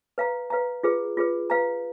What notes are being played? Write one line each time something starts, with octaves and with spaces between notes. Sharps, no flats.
B4 F5 A#5
B4 F5 A#5
F4 G#4 B4
F4 G#4 B4
B4 F5 A#5